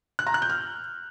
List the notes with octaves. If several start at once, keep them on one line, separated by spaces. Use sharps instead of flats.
F#6
A#5
F#6
G6
F6